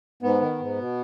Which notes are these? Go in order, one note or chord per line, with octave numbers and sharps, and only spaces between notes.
G#2 B3
D#3
G#2
B2